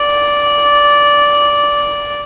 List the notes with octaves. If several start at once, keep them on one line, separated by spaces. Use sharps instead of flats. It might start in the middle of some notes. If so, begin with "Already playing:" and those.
Already playing: D5